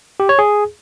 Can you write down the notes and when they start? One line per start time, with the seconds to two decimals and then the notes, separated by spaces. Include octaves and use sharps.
0.20 G4
0.29 C#5
0.39 G#4